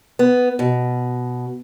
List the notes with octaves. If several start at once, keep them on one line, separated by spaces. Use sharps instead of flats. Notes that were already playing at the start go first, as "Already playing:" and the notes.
B3
B2